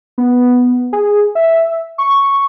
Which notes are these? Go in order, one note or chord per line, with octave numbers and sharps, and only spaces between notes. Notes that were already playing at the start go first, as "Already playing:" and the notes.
B3
G#4
E5
C#6